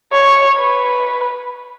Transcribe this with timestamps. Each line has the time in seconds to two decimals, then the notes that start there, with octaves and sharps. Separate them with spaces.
0.12 C#5
0.59 B4